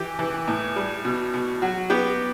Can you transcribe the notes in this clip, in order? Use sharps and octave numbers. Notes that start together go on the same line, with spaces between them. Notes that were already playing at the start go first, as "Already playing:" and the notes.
Already playing: E3 G4
E3
A2
G3
B2
B2
F#3 F#4
B3 G4